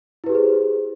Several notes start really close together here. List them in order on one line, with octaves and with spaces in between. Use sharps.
E4 B4 G4 G#4 C5